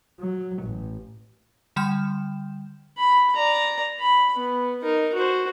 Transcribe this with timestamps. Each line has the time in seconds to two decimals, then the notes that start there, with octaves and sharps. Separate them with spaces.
0.20 F#3
0.63 A1
1.76 D3 G3 G5 G6 E7
2.97 B5
3.36 D5 A#5
4.00 B5
4.36 B3
4.83 D#4 A#4
5.14 F#4 C5